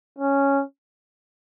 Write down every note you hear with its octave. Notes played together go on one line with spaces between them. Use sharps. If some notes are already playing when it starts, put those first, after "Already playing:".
C#4